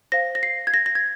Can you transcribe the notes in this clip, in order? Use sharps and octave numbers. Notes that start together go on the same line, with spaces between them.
C5 F5 A#6
A#6
C7
G#6
A#6
A#6
G#6